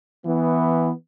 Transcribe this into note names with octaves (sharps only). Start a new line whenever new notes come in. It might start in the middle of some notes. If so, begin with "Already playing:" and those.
E3 B3